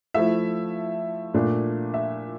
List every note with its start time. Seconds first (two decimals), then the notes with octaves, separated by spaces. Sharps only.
0.14 F3 A3 E4 E5
1.34 A#2 A3 D4
1.94 E5